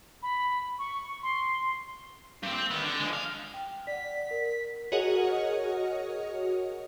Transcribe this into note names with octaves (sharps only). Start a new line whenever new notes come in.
B5
C#6
C6
G2 C4
C4
D#3 B3
D3
F3 G#3
F5
G5
D5 F#5 B6
A#4
F#4 G#4 A#4 C#5 D#5 F#5